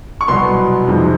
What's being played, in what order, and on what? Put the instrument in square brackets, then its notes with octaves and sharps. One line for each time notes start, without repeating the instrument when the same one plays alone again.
[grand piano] C#6
C2 B2 F#3 B3 C6
F2 C3 D#3 G#3